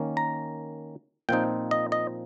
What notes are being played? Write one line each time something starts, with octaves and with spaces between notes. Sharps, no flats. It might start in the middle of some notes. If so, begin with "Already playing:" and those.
Already playing: D#3 A#3 C#4
A#5
A#2 F3 C4 D#4 G5
D#5
D#5